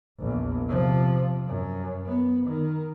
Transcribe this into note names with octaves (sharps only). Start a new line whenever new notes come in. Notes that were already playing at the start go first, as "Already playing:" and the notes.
A#1 E2
C3 F3
F#2
B3
D#3